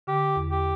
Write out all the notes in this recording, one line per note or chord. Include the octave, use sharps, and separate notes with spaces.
D3 G4
E2
G4